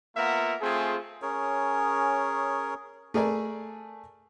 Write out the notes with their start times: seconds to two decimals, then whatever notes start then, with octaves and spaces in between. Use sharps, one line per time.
0.16 A#3 B3 F4 A#4 E5 F#5
0.61 A3 C4 F4 G#4
1.22 C#4 G#4 A#4 C#5
3.14 A3 G#4 A#4 D5 G#5